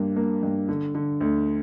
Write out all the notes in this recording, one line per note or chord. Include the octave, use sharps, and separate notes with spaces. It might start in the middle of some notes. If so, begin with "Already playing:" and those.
Already playing: G2 A#3
A#3
G2
D3
D3
D2